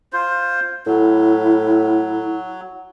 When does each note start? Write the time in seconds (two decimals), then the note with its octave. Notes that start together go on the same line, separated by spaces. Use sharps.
0.13 F4 C5
0.87 A2 F#3 E4